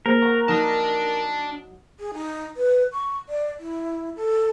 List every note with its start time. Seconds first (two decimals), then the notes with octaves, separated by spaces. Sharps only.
0.06 A#3 G#4 A#4 C5
0.22 F#5 A#5 C#6
0.48 F#3 D4 D#4 D#5 A5
2.00 G#4
2.14 D#4
2.57 B4
2.93 C#6
3.29 D5
3.60 E4
4.16 A4